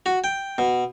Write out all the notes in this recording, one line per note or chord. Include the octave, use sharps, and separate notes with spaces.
F#4
G5
B2